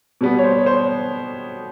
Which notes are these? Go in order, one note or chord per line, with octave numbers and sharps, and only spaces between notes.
B2 G3 B3
C#5
C5
C#5
C5